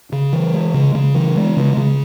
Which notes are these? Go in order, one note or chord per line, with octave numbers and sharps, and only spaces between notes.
C#3
E3
G#3
C#3
C#3
E3
G#3
C#3
C#3